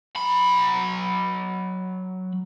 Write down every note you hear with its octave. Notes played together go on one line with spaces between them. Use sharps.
F#3 B5